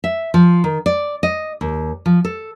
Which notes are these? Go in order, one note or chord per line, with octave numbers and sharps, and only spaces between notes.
E5
F3
D#3
D5
D#5
D#2
F3
A4